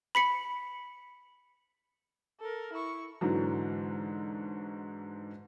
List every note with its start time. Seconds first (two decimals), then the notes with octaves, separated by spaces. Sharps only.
0.15 B5 B6 C#7
2.40 A4 A#4
2.73 E4 C#6
3.21 G#2 D3 E3 F#3